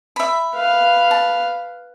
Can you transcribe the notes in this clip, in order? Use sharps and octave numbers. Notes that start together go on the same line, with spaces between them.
E5 B5
B4 F5
A5